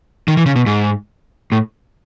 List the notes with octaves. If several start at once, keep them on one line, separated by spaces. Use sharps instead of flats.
D#3
E3
C#3
B2
G#2
A2